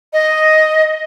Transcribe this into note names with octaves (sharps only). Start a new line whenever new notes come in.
D#5